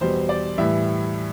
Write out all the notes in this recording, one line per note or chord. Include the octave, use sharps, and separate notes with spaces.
E2 B2 G3 C5
D5
A2 E3 G3 E5